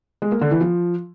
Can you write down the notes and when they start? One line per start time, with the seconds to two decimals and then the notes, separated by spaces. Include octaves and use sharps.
0.22 G#3
0.32 A#3
0.41 D3
0.51 E3
0.61 F3